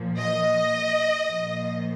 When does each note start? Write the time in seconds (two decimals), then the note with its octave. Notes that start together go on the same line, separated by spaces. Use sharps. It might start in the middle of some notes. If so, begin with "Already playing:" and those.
Already playing: A#2 F3
0.18 D#5
1.28 A#2 F3